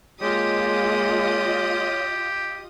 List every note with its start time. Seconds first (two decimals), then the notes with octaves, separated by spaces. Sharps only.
0.21 G#3 A#3 F4 G4 C#5 D#5 D#6